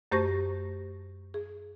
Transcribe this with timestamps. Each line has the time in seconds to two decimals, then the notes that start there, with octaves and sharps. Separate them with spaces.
0.12 F#2 A3 G4 C5 C#6 A#6
1.34 G#4